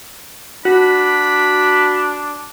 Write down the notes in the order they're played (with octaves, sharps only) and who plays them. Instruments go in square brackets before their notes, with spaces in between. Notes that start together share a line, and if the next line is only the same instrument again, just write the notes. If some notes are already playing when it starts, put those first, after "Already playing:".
[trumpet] D4 [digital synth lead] F#4 [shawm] B5